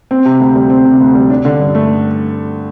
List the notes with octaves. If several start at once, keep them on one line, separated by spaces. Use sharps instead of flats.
C4
C3
D2
G3
C4
C3
D2
G3
D4
D3
G2
A3